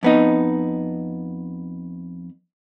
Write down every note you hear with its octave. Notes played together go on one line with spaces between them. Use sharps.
F2 B3 D#4